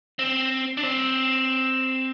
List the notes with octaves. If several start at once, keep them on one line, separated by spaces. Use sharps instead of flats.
C4
D4
C4